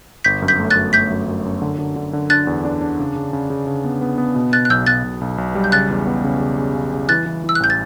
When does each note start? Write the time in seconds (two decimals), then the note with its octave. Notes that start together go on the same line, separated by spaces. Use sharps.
0.24 G1 G6 B6
0.42 F#2
0.48 G6 B6
0.59 A3
0.70 F#6 A6
0.76 F#2
0.93 A3 G6 B6
1.10 F#2
1.28 F#2
1.45 F#2
1.62 D3
1.79 D3
1.96 D3
2.13 D3
2.30 D4 F#6 A6
2.47 E2
2.65 D4
2.81 D4
2.99 C#3
3.16 C#3
3.33 C#3
3.50 C#3
3.67 C#3
3.84 B3
4.01 B3
4.18 B3
4.35 B2
4.52 B2 F#6 A6
4.65 F#6
4.70 B1 E6 G6
4.86 B1 F#6 A6
5.04 B1
5.21 B1
5.38 B1
5.55 G3
5.64 G6
5.72 C#3 F#6 A6
5.90 E2
6.07 B3
6.24 C#3
6.41 C#3
6.58 C#3
6.75 C#3
6.93 C#3
7.09 E3 F#6 A6
7.26 E3
7.44 E3 E6
7.55 F#6
7.60 A1 G6
7.70 A6